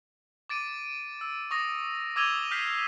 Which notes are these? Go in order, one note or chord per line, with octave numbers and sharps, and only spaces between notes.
D6 A6 D7 D#7
E6
C#6 D#6 A#6
D6 E6 G#6 D#7 F7 G7
F6 G6 B6 C7 D#7